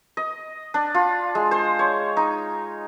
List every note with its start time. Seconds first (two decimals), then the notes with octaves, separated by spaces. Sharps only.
0.17 D#5
0.74 D4
0.94 F4
1.35 G#3
1.51 C5
1.79 C#5
2.17 D#4